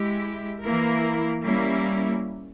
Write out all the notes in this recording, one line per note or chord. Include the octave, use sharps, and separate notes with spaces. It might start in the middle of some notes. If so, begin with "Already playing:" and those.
Already playing: G#3 E4 G4
E3 A#3 E4 A#4
G3 A#3 C#4 E4